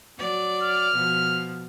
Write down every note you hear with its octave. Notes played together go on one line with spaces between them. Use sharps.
F#3 D5
F6
B2 F3